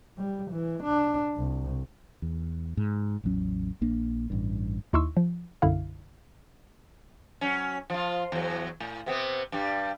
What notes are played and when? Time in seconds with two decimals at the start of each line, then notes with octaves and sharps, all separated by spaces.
0.18 G3
0.51 E3
0.83 D4
1.36 C2
2.22 E2
2.77 G#2
3.24 A1 E2 F#3 C#4
3.81 A#1 A#3 D4
4.30 A1 G2
4.93 D#2 D#4 E4 C6 C#6 E6
5.17 F3
5.62 B1 F#2 D3 E4 F5
7.41 F#3 C#4
7.90 F3 F4
8.32 E2 F#3
8.80 A2
9.06 C3 B3 C4
9.52 G2 G3